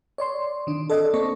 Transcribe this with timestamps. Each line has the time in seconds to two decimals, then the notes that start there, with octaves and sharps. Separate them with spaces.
0.18 C#5 D5 C6
0.67 D#3 D4
0.90 A4 D5 D#5
1.14 A#3 C4 A4 C#6